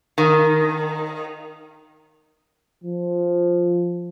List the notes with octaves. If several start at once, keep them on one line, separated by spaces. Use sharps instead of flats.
D#3
F3